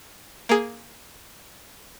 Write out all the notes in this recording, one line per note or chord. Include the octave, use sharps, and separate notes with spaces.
A#3 G#4